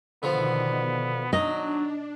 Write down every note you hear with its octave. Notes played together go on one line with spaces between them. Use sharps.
B2 D3 D#3 F3 B3
B2
F#3 D4 D#4 D#5